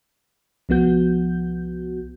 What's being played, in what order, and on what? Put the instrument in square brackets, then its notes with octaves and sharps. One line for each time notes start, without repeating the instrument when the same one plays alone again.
[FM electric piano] C2 F3 B3 F#4 G6